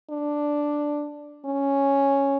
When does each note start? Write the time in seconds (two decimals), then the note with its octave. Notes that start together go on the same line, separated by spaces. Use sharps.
0.10 D4
1.46 C#4